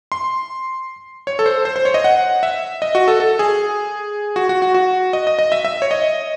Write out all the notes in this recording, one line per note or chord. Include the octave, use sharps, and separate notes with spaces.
C6
C#5
A4
C5
C5
C5
C#5
D#5
F#5
E5
D#5
F#4
A4
A4
G#4
F#4
F#4
F#4
F#4
D#5
D#5
D#5
E5
E5
C#5
D#5